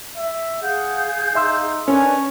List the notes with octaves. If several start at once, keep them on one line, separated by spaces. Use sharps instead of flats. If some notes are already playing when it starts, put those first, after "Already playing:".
E5
G#4 F5 F#5 G6
D#4 E5 C6 E6
C#4 D4 A#4 B4 G#5